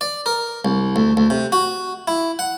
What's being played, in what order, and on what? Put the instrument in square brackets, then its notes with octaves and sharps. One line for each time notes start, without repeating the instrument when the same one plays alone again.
[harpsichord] D5
A#4
C2
D2
D2
C3
F#4
E4
F#5